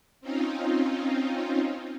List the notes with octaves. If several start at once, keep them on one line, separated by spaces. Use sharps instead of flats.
C4 C#4 D#4 F4